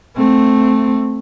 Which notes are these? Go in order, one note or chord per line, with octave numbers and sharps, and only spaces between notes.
A3 C4